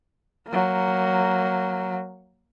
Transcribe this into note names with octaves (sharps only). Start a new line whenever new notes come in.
F#3 A#3